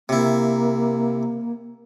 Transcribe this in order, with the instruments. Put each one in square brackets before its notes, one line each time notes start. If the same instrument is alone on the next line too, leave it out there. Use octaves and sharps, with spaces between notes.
[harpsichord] C3 E4 [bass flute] A#3